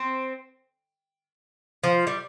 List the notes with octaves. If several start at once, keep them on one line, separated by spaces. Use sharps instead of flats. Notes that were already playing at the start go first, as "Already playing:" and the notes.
Already playing: C4
F3
G3